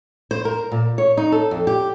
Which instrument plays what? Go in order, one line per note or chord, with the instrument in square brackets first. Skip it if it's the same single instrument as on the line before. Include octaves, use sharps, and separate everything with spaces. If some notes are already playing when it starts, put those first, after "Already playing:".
[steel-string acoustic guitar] C5
A#4
A#2
C#5
D#4
A4
F2
G4